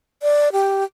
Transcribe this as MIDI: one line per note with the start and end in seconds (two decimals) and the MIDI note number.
0.23 0.52 74
0.52 0.84 67